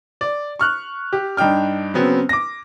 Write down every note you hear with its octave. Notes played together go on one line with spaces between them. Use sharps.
D5
C#6 F6 F#6
G4
G2 D4 D#4 G5 F6
C#3 F#3 B3 C4
D6 A#6